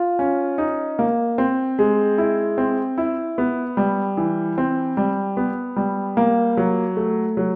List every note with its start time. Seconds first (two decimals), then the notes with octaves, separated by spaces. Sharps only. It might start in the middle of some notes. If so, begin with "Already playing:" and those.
Already playing: F4
0.19 C#4
0.58 D#4
0.99 A#3
1.38 C4
1.79 G#3
2.18 E4
2.58 C4
2.98 E4
3.38 B3
3.77 G3
4.17 E3
4.58 C4
4.97 G3
5.37 B3
5.76 G3
6.17 A#3
6.57 F#3
6.97 A3
7.37 F#3